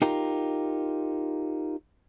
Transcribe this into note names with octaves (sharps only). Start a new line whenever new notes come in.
D#4 F4 G4 A#4